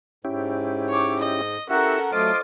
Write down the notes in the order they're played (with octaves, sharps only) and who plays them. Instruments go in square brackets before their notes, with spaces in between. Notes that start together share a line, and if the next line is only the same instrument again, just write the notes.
[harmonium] G#2 [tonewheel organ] C#4 E4 G4
[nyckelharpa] C#5 D6
D#5
[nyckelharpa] C#4 A4 [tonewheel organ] E4 G4 E5 [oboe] F#4 [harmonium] A#4 F#5
[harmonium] F#3 A3 [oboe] F4 [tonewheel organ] C5 D#5 D6